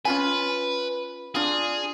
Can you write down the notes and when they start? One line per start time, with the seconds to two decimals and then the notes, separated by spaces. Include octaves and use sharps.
0.05 C#4 F4 B4 G#5
1.35 D4 F4 G#4